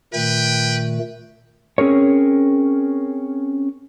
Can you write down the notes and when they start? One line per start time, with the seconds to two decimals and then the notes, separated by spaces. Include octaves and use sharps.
0.14 A#2 D#3 A3 B4 G5
1.78 C4 C#4 G#4 A#4 C#5